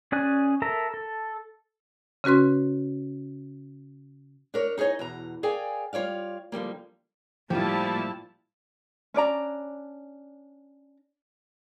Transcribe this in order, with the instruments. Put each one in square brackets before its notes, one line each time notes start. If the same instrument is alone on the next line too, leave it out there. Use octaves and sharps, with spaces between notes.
[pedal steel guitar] C#4 G#4 D5 G#5 F#6
A4 A#4 E5 A#5
A4
[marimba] C#3 C#4 F#4 B4 C6
[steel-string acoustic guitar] D4 A#4 C#5
D#4 G#4 A4 C#5 D#5
E2 B2 A#5
G#4 A#4 D5 F5 G5 G#5
G3 F4 C#5 D5 F5
D3 F3 G3 A#3
[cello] A2 G3 [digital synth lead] F3 [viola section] A#3 E4 A5 [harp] F4 G4
[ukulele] C#4 D4 D5 A#5